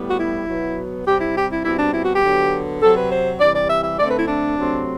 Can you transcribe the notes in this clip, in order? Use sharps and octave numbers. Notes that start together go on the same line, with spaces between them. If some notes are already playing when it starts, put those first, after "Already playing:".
Already playing: A2 G3 B3
F#4
E4
B2 F#3 B3
C3 G3 C4 G4
E4
G4
E4
B2 G3 C4 E4
D4
E4
F#4
G4
D3 F#3 B3
C3 F#3 C4 A4
B4
C5
C3 E3 G3 D5
D5
E5
E5
D3 A3 C4 D5
B4
E4
D4
C3 F#3 A3 C4